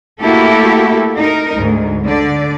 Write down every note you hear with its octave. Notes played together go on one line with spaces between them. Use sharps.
A3 A#3 E4 F#4 G4 A4
D#4 A#4
D2 G#2
D3 D5